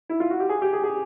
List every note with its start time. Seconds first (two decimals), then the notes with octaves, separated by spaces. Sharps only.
0.09 E4
0.20 F4
0.30 F#4
0.40 G4
0.49 G#4
0.62 G4
0.73 G#4
0.84 G#4